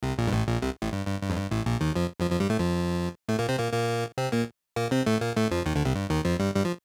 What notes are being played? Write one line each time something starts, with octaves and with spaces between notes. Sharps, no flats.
C2 C3
A#1 A#2
G2
A1 A2
A#1 A#2
C2 C3
A1 A2
G2
G2
G2
F2
G2
A1 A2
A#1 A#2
D#2 D#3
F2 F3
F2 F3
F2 F3
G2 G3
A2 A3
F2 F3
A2 A3
A#2 A#3
C3 C4
A#2 A#3
A#2 A#3
C3 C4
A#2 A#3
A#2 A#3
C3 C4
A2 A3
A#2 A#3
A2 A3
F2 F3
D#2 D#3
D2 D3
C2 C3
G2
D#2 D#3
F2 F3
G2 G3
G2 G3
F3